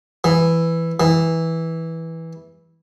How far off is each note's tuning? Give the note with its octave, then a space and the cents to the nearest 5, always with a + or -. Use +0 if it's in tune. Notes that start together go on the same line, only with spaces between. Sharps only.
E3 +5
E3 -10